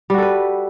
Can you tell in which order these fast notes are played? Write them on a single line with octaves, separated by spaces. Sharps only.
G3 F#4 A4 B4